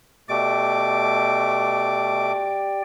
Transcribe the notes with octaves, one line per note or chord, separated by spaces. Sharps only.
B2 A3 G4 D5 G5 D6